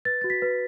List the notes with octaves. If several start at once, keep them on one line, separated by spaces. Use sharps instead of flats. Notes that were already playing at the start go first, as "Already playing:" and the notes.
B4 A6
F#4 A6
B6
B4